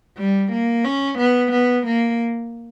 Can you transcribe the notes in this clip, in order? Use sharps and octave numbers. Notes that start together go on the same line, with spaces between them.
G3
A#3
C#4
B3
B3
A#3